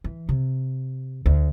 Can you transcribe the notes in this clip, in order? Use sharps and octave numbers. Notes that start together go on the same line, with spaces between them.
E3
C3
D2